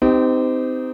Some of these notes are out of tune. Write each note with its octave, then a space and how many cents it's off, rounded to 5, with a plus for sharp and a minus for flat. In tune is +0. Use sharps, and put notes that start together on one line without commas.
C4 -30 D#4 +5 G4 +0